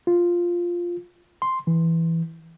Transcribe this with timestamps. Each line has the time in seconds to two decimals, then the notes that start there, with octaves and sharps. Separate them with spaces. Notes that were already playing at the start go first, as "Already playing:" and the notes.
0.07 F4
1.42 C6
1.67 E3